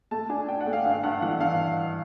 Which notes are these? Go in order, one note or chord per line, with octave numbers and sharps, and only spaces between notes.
A3 A5
D4 G#5
D4 G5
F#5
A3
F5
G2 F5
G2 F#5
E3 F#5
G2 F5